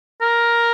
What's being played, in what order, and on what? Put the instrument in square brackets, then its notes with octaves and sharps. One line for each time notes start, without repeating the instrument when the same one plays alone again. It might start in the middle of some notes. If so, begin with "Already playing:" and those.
[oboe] A#4